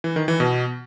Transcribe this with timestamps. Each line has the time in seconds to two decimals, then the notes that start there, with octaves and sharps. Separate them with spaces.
0.04 E3
0.16 D#3
0.28 E3
0.40 B2